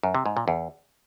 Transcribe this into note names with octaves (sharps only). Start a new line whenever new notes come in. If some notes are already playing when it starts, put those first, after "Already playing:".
F#2
C3
G#2
A#2
E2